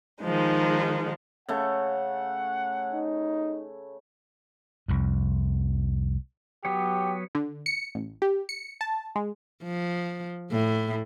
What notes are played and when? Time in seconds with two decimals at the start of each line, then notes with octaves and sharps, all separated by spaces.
0.22 D#3 F3 G#3 D#4
1.49 C#3 A3 F#5
2.93 D#4
4.88 C2 F2
6.65 F#3 B3 G4 C#5
7.35 D3
7.66 C#7
7.95 A1
8.22 G4
8.49 C#7
8.81 A5
9.16 G#3
9.64 F3
10.51 A2